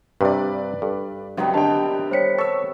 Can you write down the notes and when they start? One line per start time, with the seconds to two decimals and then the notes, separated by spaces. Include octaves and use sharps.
0.21 G2 C3 B4 D5
0.82 G2 A4
1.37 C#2 C3 D#3 F#3 B3
1.54 D3 G4 D#5 G5 A5
2.11 G3 C5 C#5 B6 C#7
2.38 A4 C#6 E6